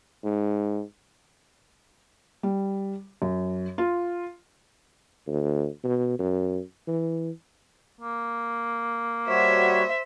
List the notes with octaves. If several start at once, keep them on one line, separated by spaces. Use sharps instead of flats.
G#2
G3
F#2
F4
D2
B2
F#2
E3
A#3
G3 F#4 C5 C#5 E5